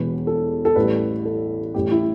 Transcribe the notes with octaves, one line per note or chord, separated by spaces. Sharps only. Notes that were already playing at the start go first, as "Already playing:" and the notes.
Already playing: E1 E2 B2 B4
A4
A4
A1 A2 E3 G3 B4
A4
A1 A2 G3 G4
E4